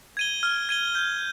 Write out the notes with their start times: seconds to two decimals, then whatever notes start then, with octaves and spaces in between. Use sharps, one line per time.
0.17 G#6 D#7 G7
0.43 F6
0.69 G#6 D#7 G7
0.95 G6